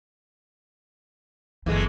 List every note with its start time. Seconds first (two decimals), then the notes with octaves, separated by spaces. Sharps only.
1.66 G1 F#2 E3 G#3 A3